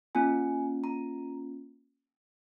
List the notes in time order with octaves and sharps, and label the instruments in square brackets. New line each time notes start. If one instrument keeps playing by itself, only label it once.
[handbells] A#3 C#4 F4 G#5
A#5